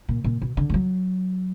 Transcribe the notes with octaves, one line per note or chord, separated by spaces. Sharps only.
A#2
A#2
B2
D3
G#3
F#3